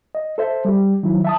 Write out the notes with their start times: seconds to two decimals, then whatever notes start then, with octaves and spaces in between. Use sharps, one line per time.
0.15 D#5
0.38 A4 C5 E5
0.65 G3 G4
1.03 D#3 F#3 E4
1.25 E5 A5 D#6